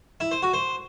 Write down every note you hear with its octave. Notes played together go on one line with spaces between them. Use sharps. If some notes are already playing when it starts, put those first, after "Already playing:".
E4
C5
F#4
C5